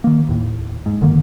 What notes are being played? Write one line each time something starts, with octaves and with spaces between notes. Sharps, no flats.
D#3 A#3
D#2 A2
G#2
F#1 D3 D#3 A#3